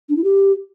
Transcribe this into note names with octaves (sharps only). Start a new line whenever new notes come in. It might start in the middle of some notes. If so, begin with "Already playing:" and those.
D4
E4
G4